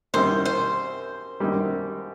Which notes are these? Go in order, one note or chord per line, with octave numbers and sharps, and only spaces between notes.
F#2 D#3 G3 C4 E4 C5
C5
F#2 D#3 G3